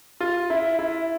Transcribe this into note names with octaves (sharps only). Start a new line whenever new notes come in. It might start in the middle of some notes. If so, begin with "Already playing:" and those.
F4
E4
E4